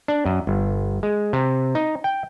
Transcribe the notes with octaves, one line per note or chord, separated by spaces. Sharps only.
D4
F#2
G1
G#3
C3
D#4
G5